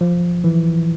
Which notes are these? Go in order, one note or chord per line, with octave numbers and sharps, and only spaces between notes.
F3
E3